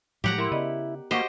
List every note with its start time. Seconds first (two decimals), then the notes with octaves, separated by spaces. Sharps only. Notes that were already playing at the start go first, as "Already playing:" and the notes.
0.24 A2 F3 F#3 G#3 G4 F#5 A#5
0.38 E4 A#4 C6
0.51 C#3 B3 D5 D#5
1.11 A#3 F#4 G4 C5 D#5 F#5 C#6